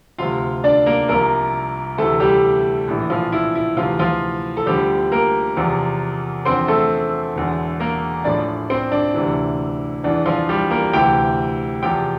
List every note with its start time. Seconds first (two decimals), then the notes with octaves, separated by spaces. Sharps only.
0.18 D2 C3 F3 F4 F5
0.64 D4 D5
0.86 A#3 A#4
1.08 C2 C3 F3 A#3 A#4
1.98 D2 C3 E3 A3 A4
2.20 G3 G4
2.88 A#1 A2 E3
3.10 F3 F4
3.32 E4
3.55 E4
3.77 D2 C3 E3 F3 F4
3.99 F3 F4
4.57 A4
4.66 D2 D3 F3 G3 G4
5.12 A#3 A#4
5.57 E2 C3 F3
6.45 E2 D3 F3 C4 C5
6.68 A3 A4
7.35 E1 E2 D3
7.80 A#3 A#4
8.24 A1 A2 F3 D4 D5
8.70 C4 C5
8.92 D4
9.14 D2 C3 E3
10.04 E2 E3 D4
10.26 F3 F4
10.49 G3 G4
10.71 A#3 A#4
10.93 D2 C3 E3 G4 G5
11.83 E2 C3 F3 G4 G5